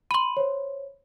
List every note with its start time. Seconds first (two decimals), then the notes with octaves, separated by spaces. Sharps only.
0.11 B5 C6 D#7 F#7
0.37 C5 C#5